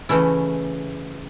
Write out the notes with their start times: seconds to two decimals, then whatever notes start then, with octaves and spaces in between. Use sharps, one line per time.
0.09 C#3 E3 A3 C#4 E4